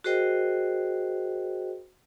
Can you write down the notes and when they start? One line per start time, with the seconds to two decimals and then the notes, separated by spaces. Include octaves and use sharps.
0.04 F#4 G#4 A#4 C5 D#5 G5